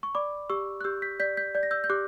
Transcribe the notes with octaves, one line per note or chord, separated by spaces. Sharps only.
C#6
D5 B5 D6
G4 C#6 E6
F#6
G4 E6 G6
G6 B6
D5 G6 B6
G6 B6
D5 G6
A#6
E6 G6
G6
G4 D6 F#6